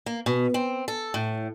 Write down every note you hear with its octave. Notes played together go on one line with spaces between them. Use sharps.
A#3
B2
C4
A4
A2